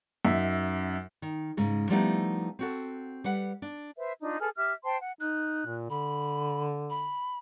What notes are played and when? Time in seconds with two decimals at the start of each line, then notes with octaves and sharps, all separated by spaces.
0.25 F#2 D#4 E5
1.22 D#3
1.57 G#2 C#3 G#3
1.90 F3 G3 A3 B3 D#4 E4
2.59 C4 F#4 A4
3.24 G3 B4 F#5
3.62 D4
3.96 B4 C5 E5
4.21 D4 D#4 F4
4.40 G#4 A4 B4 F6
4.56 G4 E5 D6 F6
4.84 C5 G5 A5 C6
5.00 F#5
5.20 D#4 F#6
5.67 A#2
5.90 D3 B5
6.90 B5